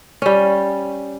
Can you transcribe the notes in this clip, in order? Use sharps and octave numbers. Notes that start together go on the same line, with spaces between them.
G3 C#4